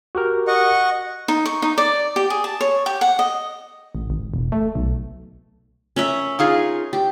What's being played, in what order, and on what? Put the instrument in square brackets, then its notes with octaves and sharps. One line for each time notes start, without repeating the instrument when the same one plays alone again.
[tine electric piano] F#4 G4 A#4
[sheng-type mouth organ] D#5 F#5 C#6
[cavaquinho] D#4
C#6
D#4
D5
G4
G#4
A5
C#5
G4
F#5
D#5
[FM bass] A1
G#1
E1
A3
B1
[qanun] C#4 A#4 E5
[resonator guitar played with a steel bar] D#4 F4 G#4
[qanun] G4